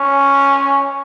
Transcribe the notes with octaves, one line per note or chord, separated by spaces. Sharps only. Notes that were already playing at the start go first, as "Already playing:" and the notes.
Already playing: C#4